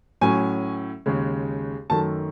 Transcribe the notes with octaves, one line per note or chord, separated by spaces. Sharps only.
A2 F#3 C#4 G#5
D#2 C#3 G#3
F#2 D#3 A3 A5